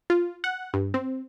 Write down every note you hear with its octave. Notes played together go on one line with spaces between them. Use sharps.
F4
F#5
G2
C4